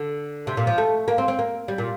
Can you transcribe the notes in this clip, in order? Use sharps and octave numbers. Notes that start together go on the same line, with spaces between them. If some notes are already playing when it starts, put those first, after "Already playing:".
Already playing: D3
C3
A#2
F3
A3
A#3
C4
C4
A#3
G3
A#2